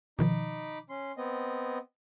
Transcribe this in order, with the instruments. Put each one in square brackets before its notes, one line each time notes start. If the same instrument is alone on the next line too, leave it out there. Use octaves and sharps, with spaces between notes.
[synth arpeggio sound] B2 D#3 F3 [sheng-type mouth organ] D#4 B5 D6
[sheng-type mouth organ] C#4 C6
B3 C4 D#5